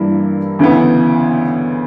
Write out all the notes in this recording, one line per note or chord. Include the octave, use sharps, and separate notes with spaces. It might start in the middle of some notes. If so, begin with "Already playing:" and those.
Already playing: G2 E3 G3 A#3 E4
D2 C#3 E3 B3